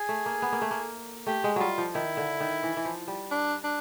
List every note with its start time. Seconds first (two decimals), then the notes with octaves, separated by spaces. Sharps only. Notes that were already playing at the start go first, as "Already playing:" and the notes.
Already playing: G#4
0.09 A3
0.26 A#3
0.42 B3
0.52 A#3
0.62 A3
0.71 A#3
1.27 A3 G4
1.44 G#3
1.56 F#3 G3 F4
1.78 F3
1.95 D#3 E4
2.17 D3
2.40 D#3
2.63 E3
2.77 E3
2.85 F3
3.08 G3
3.31 D4
3.64 D4